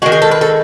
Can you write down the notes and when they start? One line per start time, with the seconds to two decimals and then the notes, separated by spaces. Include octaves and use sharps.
0.02 D#3 G#3 F#4
0.12 G#4
0.22 A4
0.31 B4
0.41 A4